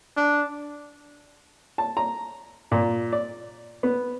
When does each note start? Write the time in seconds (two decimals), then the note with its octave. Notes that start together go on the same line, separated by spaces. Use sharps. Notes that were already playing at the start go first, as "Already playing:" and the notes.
0.17 D4
1.78 A5
1.97 A#5
2.72 A#2
3.13 D5
3.83 B3